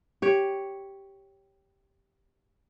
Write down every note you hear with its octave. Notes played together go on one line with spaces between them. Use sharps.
G4 C#5